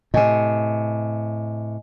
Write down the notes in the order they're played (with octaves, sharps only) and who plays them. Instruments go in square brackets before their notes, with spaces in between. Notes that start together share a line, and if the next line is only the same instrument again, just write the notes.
[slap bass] A2 C3 [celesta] D#5 G#5